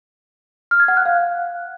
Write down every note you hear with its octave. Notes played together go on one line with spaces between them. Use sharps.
F6
G#6
F#5
F#6
F5